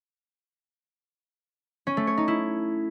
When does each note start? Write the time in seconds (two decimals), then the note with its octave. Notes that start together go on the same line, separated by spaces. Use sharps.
1.87 C#4
1.97 A3
2.07 C#5
2.17 D#4
2.28 E4